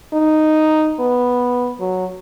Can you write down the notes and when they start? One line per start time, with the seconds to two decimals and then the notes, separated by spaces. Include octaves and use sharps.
0.13 D#4
1.00 B3
1.80 F#3